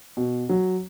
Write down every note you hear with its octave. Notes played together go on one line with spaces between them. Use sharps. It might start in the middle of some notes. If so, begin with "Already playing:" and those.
B2
F#3